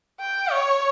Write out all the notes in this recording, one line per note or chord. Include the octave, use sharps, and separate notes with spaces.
G5
C#5